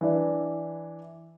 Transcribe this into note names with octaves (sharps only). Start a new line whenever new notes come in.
E3 D4 E4